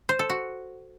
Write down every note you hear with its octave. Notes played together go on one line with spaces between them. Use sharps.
C5
A4
F#4